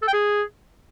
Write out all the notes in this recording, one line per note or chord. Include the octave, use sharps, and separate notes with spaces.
A4
G5
G#4